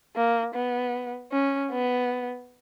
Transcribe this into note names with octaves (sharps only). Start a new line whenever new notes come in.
A#3
B3
C#4
B3